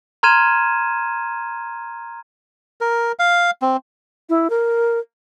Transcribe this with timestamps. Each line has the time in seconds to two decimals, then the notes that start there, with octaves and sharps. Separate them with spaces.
0.23 A#5 C6 F6 G#6 D#7 E7
2.81 A#4
3.19 F5
3.62 C4
4.29 E4
4.50 A#4